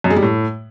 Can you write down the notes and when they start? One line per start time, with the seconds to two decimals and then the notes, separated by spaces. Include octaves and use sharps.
0.04 F#2
0.10 G#3
0.16 G3
0.22 A2